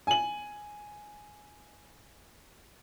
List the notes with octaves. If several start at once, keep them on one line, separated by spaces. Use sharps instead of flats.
G#5 F#7